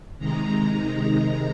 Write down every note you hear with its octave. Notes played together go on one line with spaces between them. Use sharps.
C3 D#3 G#3 D#4 A#5
A#5